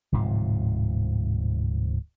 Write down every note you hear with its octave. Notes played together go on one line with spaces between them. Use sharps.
D1 G#2 C3 F3